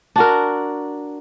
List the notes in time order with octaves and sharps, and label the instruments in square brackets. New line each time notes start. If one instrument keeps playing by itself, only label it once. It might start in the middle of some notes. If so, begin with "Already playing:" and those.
[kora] D4 F#4 A#4